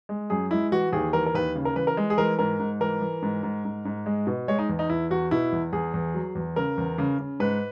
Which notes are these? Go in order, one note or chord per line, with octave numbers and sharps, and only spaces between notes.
G#3
F#2 G#4
G#3 E4
E3 F#4
D#2 G#4
E3 A#4
A#4
D#2 B4
C#3
A#4
E3 B4
A#4
G#3
G#4
E3 A#4
G#2 A#4
G#2
E3 A#4
E3
G#2
G#2
G#2
G#2
G#3
B2
G#3 C#5
D#4
E2
D#4
E2 E4
E2 F#4
B2 E4
E2
E2 G#4
E2
F#3
E2
C#3 A#4
E2
C#3
C#3
G#2 B4